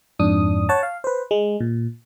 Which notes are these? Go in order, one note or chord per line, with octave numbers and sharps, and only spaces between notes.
F2 G#2 D4 D#6
C#5 F#5 A5
F5
B4 C5
G#3
A#2